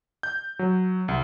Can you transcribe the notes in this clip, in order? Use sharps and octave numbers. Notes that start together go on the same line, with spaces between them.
G6
F#3
C2